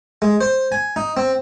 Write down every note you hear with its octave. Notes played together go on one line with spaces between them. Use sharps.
G#3
C5
G#5
D#4
C4